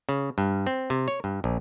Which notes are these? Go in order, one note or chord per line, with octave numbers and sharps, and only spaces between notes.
C#3
G2
C4
C3
C#5
G2
A#1